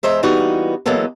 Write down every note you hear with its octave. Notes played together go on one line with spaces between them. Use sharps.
E2 G#3 C5 E5 A#5
E3 G3 A#3 B3 D#4 F#4
E3 F#3 G#3 A#3 B3 A4